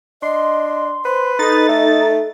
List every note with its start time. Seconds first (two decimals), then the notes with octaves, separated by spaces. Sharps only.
0.22 D4 D#5 C6
1.05 B4 C5
1.39 D#4 A4 A6
1.68 A3